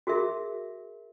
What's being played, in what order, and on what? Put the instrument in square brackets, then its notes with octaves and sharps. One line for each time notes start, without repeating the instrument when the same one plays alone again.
[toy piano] F#4 G#4 A#4 E5